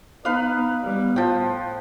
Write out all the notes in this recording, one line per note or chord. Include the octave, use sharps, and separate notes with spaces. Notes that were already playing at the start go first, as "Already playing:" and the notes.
B3 D#4 B4 F5
G3 B3
A2 F3 G5